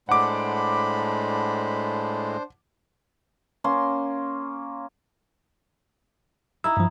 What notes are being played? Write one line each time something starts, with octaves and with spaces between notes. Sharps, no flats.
A2 G#3 D4 C5 F#5 B5 D6
A#3 C#4 C6
D#4 E4 E6
G2 F3